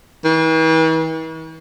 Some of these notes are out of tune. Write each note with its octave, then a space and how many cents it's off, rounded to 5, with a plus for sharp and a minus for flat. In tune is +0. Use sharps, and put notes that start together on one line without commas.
E3 -45